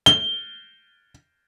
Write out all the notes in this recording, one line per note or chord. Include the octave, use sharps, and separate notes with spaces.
G7